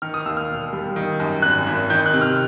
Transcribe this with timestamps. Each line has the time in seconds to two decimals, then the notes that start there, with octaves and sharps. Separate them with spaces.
0.02 D#3 F6
0.14 D#6
0.25 D#2 E6
0.37 F6
0.48 E1
0.73 G3
0.96 D#3
1.20 F#2
1.42 G#1 F#6
1.66 G#1
1.90 D#3 G6
2.06 F#6
2.14 C3
2.21 F6